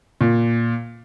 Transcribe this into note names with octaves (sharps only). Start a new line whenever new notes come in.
A#2